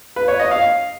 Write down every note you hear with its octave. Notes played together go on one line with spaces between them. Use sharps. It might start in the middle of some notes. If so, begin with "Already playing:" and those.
B4
C#5
D#5
F5